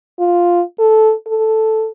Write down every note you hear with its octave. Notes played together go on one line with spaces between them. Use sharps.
F4
A4
A4